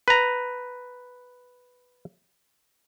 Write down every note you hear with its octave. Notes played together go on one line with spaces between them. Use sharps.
B4 A#5